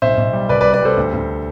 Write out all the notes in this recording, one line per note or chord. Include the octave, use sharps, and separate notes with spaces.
B1 C5 E5
B1
G3
C2 B4 D5
B4 D5
G3
B4 D5
G3 A4 C5
D2
D2